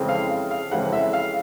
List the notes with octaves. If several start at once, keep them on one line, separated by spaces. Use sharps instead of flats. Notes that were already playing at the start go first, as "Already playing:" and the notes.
Already playing: F2 C#3 E3 G#3 C4
F5
F5
F2 C#3 E3 G#3 C4 F#5
E5
F5